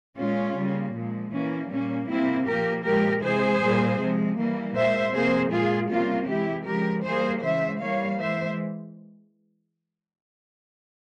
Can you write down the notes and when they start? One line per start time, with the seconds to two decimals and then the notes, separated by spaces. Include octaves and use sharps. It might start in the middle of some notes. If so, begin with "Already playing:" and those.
0.17 A#2 G#3 C#4 F4
0.55 C#3 G3 A#3
0.94 A#2 F3 G#3
1.32 E3 A#3 C#4
1.69 A#2 G3 A#3 C#4
2.08 C3 G3 A#3 C4 E4
2.46 A#2 F3 A#3 G4 A#4
2.84 A#2 F3 G#3 G4 A#4
3.22 C3 E3 G#3 G#4 C5
3.61 A#2 G3 A#3
3.99 C3 F3 G#3
4.37 E3 G3 A#3
4.75 A#2 G#3 C5 E5
5.13 C3 F3 A#3 G#4 C5
5.51 A#2 G#3 F4 G#4
5.90 C3 G3 A#3 C#4 F4
6.28 E3 G#3 E4 G4
6.66 C#3 F3 G#3 G4 A#4
7.04 E3 G3 A#3 G#4 C5
7.43 C#3 E3 G#3 C5 E5
7.80 E3 G3 A#3 C#5 F5
8.19 E3 G#3 C5 E5